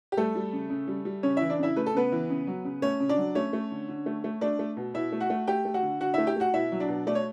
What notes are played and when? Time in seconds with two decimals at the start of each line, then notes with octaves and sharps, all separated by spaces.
0.12 G4
0.17 G3 A3 A4
0.35 G3
0.53 C#3
0.70 C#3
0.88 G3
1.05 G3
1.23 C#3 C#4 C#5
1.37 E3 E4 E5
1.50 D4 D5
1.59 C#3 E4 E5
1.76 A3 B4
1.86 A4
1.94 C#3 B3 B4
2.12 E3
2.30 C#3
2.47 F#3
2.65 C#3
2.82 A3 C#4 C#5
3.00 C#3
3.09 D4 D5
3.17 F#3
3.35 A3 C#4 C#5
3.53 A3
3.71 D3
3.89 D3
4.06 A3
4.24 A3
4.41 A3 D4 D5
4.59 A3
4.77 B2
4.94 B2 E4 E5
5.12 A3
5.20 F#4 F#5
5.30 A3
5.47 A3 G4 G5
5.65 A3
5.74 F#4 F#5
5.83 D3
6.01 D3 F#4 F#5
6.14 A3 E4 E5
6.27 G4 G5
6.36 A3 F#4 F#5
6.54 B2 E4 E5
6.72 F#3
6.80 D4 D5
6.88 B2
7.07 A3 D5
7.15 C#5